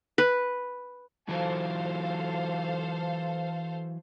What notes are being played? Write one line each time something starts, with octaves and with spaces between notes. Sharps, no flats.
B4
E3 F#3 A4 C5 F5